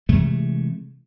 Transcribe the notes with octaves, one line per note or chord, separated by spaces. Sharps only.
C3 E3 G#3 A3